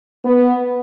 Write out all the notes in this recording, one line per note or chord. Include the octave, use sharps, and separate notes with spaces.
B3